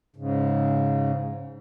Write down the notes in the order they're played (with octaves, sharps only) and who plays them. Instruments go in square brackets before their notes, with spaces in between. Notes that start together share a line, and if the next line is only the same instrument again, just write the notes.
[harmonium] G#2 C#3